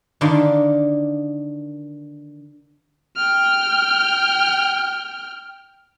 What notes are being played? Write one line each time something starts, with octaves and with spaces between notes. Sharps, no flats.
D3 D#3 A#3 A5 C6
G5 F6